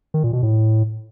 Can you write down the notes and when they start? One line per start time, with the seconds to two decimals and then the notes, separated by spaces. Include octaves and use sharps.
0.14 D#3
0.24 A#2
0.33 B2
0.43 A2